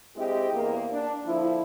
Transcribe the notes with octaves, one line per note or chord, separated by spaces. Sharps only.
G#3 C4 D4 E4 G4 D#5
E2 A#3
D4
D3 F3 A#3 E4